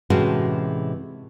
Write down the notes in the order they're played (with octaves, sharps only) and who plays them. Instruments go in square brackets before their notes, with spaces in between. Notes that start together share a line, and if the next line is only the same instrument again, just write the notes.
[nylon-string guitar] A2 C3 E3 G#3 C#4 F#4